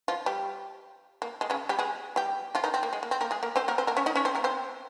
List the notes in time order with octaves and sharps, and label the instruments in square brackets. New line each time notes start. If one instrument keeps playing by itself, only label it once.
[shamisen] F3 F4
G3 G4
A#3
G#3
C#3 C#4
G3 G4
G#3 G#4
G3 G4
F3 F4
D#3 D#4
C4
A#3
G#3
A#3
C4
A#3 A#4
G#3 G#4
A#3 A#4
C4 C5
A#3 A#4
C4 C5
A#3 A#4
C#4 C#5
D#4 D#5
C#4 C#5
C4 C5
A#3 A#4
C4 C5